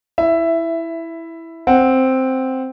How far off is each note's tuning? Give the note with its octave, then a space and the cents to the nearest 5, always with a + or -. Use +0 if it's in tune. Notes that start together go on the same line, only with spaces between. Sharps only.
E4 +0 E5 +10
C4 +0 F#5 +0